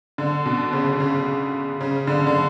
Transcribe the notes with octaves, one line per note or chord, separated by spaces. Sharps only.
D3
B2
C#3
C#3
C#3
D3
D3